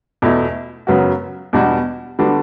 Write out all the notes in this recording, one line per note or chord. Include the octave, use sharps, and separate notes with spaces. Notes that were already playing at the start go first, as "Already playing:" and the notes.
E2 B2 A3 E4
F#2 C#3 F#3 B3 F#4
E2 B2 G3 D4 F#4
D3 G3 B3 D4 F#4